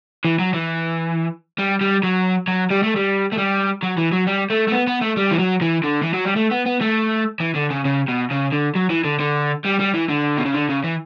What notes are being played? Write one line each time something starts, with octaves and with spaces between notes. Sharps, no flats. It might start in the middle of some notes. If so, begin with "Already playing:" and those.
E3
F#3
E3
G3
G3
F#3
F#3
G3
A3
G3
A3
G3
F#3
E3
F#3
G3
A3
A3
B3
B3
A3
G3
E3
F#3
E3
D3
E3
F#3
G3
A3
B3
B3
A3
E3
D3
C#3
C#3
B2
C#3
D3
F#3
E3
D3
D3
G3
G3
E3
D3
B2
C#3
D3
C#3
E3